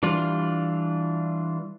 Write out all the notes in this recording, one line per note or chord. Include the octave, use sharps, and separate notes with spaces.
E3 G3 D4 F4